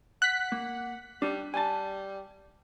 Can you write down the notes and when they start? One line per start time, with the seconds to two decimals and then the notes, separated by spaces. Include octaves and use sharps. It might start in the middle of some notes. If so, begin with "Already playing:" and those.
0.22 F#5 F#6 B6
0.52 A#3
1.22 G3 D4
1.54 G3 G#5 A5